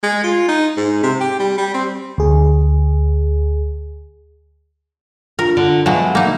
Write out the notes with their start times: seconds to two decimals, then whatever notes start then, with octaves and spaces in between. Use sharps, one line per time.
0.03 G#3
0.24 F4
0.48 D#4
0.77 G#2
1.03 C3
1.21 G4
1.40 G3
1.58 G3
1.74 C4
2.18 D2 G#4
5.39 D4 F4 A#4
5.57 D3 D7
5.86 B2 F3 F#3 G#3 E5 F#5 B5
6.15 A#3 D#4 E5